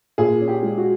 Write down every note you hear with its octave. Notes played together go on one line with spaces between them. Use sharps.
A#2 G#4
C#4
G4
G#3
F#4